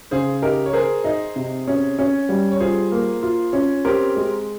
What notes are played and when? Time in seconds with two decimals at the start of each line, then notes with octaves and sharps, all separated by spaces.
0.11 C#3 G#4 C5
0.42 D#4 G4 A#4
0.66 C#5
0.73 G#4 A#4 C5
1.04 D#4
1.36 C3
1.67 C#4
1.99 C#4
2.29 G3
2.51 C#5
2.60 F4 G#4 C5
2.92 A#3
3.22 F4
3.53 C#4
3.85 C4 G4 A#4
4.16 G#3